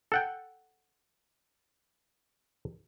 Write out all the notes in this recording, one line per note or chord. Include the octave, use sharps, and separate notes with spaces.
A4 F#5 G5